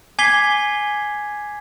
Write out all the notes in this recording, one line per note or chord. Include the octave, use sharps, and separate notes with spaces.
G#5 D6 G#6 B6 C7 G7